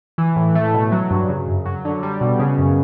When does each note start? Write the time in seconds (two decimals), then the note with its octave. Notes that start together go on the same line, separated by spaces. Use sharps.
0.18 E3
0.36 A2
0.55 A3
0.74 B2
0.92 F#3
1.11 G2
1.29 C#3
1.48 F#2
1.65 F#3
1.85 D3
2.03 G3
2.21 B2
2.39 C#3
2.58 F#2